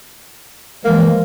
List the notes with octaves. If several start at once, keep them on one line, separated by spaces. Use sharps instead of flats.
E3 F3 G#3 A#3